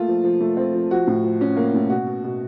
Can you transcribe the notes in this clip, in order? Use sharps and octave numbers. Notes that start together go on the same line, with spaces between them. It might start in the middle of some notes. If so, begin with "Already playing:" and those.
Already playing: A3 A#3 F4
F3
F3
A3
C4
F3
F3 F#4
A2
F3
C#4
A#3
A2
B2 F#4
B2
B2